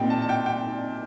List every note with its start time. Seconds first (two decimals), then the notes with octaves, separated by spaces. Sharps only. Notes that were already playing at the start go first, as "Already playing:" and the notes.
Already playing: A#2 G3 C4 D#4 G5
0.10 A5
0.22 A5
0.29 G5
0.46 G5